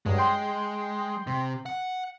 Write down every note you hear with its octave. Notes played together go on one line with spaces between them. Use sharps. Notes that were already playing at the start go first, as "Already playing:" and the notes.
G2 F#3 G#3
G5 C6
C3
F#5